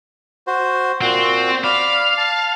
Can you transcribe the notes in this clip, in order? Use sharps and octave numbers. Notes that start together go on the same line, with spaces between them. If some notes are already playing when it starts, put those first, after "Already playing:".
F#4 C5
A#2 C4 F#4
D5 F5 B5
A5